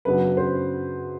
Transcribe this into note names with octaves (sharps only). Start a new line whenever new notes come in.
F#2 C#3 F#3 B3 D4 B4
C5